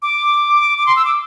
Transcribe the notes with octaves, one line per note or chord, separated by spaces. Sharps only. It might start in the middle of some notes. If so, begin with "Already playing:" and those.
D6
D6
C6
E6
D6